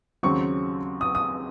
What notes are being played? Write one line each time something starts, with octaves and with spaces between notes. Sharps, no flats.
D#2 C#3 F#3 C4 C#6
D#6
D#6